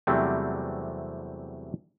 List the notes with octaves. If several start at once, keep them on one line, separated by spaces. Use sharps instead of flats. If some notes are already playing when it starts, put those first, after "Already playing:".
E2 C3 F#3 G3 A3 C4